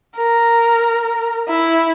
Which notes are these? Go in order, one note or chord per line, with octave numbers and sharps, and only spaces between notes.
A#4
E4